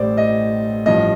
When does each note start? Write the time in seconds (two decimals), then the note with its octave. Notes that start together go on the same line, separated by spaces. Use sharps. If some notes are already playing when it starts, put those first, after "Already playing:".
Already playing: A1 A2 G3 C5 D5
0.18 D#5
0.86 A1 G2 F3 D#5